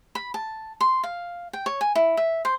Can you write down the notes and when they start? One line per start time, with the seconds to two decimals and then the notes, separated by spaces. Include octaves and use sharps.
0.15 B5
0.34 A5
0.81 C6
1.04 F5
1.53 G5
1.66 C#5
1.81 G#5
1.95 E4
2.17 E5
2.45 C5